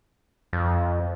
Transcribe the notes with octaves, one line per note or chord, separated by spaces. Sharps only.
F2